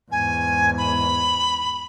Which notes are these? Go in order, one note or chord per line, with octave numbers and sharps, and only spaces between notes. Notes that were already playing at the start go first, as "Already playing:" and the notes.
E2 G#2 G#5
B5